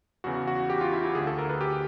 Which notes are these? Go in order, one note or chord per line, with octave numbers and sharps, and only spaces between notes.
E2 C#3 E3 F#4
F#4
G4
F4
E4
E4
D2 D3 G#4
A4
A#4
B4
G4